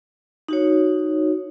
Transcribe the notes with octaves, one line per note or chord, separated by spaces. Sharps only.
D#4 F#4 C#5